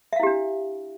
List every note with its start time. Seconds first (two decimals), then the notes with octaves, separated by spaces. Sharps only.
0.13 E5
0.16 F5
0.20 E4
0.23 G4
0.27 D4